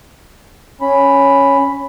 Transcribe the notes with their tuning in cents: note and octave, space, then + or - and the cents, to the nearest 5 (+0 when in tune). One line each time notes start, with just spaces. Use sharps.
C#4 +0 B5 +0